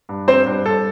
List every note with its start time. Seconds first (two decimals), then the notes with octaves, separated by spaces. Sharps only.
0.09 G2
0.28 G2 C4 C5
0.46 G2
0.65 G2 A4